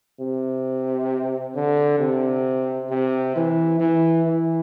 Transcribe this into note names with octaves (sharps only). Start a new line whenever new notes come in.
C3
D3
C3
C3
E3
E3
E3